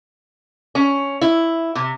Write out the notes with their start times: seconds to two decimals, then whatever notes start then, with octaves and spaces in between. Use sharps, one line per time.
0.75 C#4
1.21 E4
1.75 C3